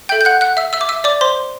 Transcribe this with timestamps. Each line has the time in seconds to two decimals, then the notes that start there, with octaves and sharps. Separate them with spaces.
0.09 A4 E5 G5 G6
0.21 G6
0.25 F#5 F#6
0.41 F#5 F#6
0.57 E5 E6
0.73 E5 E6
0.81 D6
0.89 E5 E6
1.04 D5 D6
1.21 C5 C6